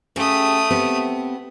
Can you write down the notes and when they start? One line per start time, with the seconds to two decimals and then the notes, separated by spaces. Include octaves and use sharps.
0.16 C#3 A3 G4 G#4 D#6
0.70 B3 C4 G4